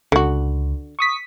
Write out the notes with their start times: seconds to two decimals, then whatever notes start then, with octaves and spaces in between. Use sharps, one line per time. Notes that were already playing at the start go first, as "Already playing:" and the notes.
0.12 C#2 D3 F#4
0.99 C#6 D#6 B6